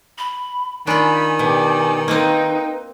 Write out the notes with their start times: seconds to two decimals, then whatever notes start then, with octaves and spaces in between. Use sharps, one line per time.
0.18 B5
0.87 D#3 D4 F4 G#5 B5
1.39 B2 G4 D5
2.08 A#3 C4 D#4 B4 G5